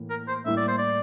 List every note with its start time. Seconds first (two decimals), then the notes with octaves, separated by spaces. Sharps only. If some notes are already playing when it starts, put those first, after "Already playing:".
Already playing: A2 E3 A#3
0.10 A#4
0.28 C5
0.45 A2 G3 A#3 E4 E5
0.57 D5
0.68 C5
0.78 D5